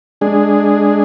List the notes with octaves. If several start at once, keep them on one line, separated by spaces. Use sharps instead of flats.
G#3 D4 G#4